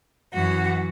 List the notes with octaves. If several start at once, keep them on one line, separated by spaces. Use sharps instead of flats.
F#2 E3 F#4